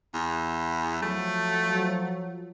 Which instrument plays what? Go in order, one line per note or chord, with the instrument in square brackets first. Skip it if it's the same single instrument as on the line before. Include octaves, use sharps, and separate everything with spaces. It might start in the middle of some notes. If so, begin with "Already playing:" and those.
[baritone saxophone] E2
[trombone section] F3 F#3 [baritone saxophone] A3